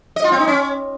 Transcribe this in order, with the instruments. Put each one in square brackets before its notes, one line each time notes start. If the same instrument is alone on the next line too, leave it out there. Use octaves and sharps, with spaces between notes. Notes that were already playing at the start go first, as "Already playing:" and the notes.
[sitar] D#5
F4
C4
D#4
C#4